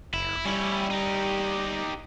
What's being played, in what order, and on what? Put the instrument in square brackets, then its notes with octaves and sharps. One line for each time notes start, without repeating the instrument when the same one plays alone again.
[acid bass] F#1 [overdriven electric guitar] E4
[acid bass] G3 [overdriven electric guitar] C#4 E4
[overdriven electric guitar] D#4 G4